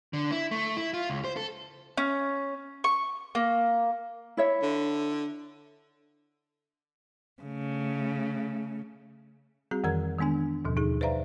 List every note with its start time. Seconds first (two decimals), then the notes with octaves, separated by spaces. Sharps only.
0.13 D3
0.32 E4
0.51 A3
0.77 E4
0.94 F4
1.10 C#2
1.24 C5
1.37 A4
1.97 C#4
2.84 C#6
3.35 A#3
4.37 E4 C#5 E5
4.63 D3
7.42 C#3 A3
9.71 G3 C4 F#4 G#4
9.84 F2 D#3 E3 A#4 A#5 G#6
10.18 D#3 G#3 B3 D4 G#5
10.65 D#2 G#2 B2 F3
10.77 D#4 G#4
11.01 B4 C5 D5 E5 F5 A#5